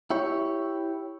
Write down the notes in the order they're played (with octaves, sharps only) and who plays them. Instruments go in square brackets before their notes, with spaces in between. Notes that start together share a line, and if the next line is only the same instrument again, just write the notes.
[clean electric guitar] E4 G4 C#5